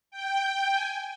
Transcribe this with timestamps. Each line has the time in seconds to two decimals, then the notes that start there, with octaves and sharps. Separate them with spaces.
0.11 G5
0.73 G#5